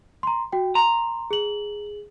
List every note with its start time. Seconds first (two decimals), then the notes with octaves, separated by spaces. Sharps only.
0.23 A#5 C6
0.53 F#4 G5
0.75 A#5 C6
1.31 G#4 F#7